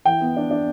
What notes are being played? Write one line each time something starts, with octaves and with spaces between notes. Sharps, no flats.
E3 G5
B3
D4
D4